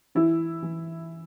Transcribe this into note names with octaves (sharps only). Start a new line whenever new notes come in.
E3 E4
E3